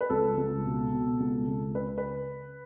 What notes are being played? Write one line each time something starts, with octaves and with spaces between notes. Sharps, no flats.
B4
C#2 A4
C#2
B2
B2
C#2
C#2
C#3 B4
B4